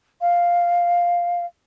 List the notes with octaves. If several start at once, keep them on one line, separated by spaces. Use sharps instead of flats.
F5